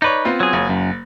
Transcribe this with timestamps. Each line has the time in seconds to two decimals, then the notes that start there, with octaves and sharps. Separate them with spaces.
0.02 D#4 B4 C#5 D5
0.25 B3 C4 F4
0.40 F#3 G#4
0.53 F#1
0.69 F#2